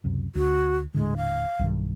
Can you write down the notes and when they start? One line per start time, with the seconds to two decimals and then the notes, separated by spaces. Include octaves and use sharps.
0.04 C#2 F#2 C3
0.35 D2 F#4
0.94 D#1 A2 D3 G#3
1.17 F5
1.59 B1 G2 D#3